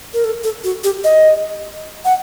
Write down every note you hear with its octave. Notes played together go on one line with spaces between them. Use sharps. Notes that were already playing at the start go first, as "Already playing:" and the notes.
A#4
A4
A4
F#4
G4
D#5
F#5